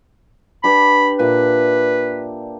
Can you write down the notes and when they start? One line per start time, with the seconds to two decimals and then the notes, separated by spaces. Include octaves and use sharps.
0.64 D4 G4 B4 B5
1.19 A#2 B4 E5